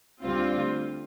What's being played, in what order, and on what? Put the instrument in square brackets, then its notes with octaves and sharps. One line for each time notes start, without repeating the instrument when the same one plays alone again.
[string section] D2 D3 G3 C4 F4